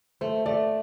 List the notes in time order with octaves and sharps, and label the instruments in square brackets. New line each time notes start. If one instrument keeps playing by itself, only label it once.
[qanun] A3 [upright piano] C5
[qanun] A3 [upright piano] D5